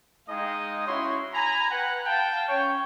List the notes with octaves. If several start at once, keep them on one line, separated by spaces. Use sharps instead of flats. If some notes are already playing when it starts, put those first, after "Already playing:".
G#3 D#4 D#5 F5 G5 D#6
C#4 E4 F#4 C#5 C6
G#5 A#5 B5
B4 F#5 G5
F5 G5 A5
C#4 C#5 G5